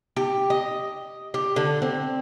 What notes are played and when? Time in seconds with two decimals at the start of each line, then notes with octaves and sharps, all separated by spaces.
0.16 G4
0.50 D#5
1.34 G4
1.56 D3
1.82 C4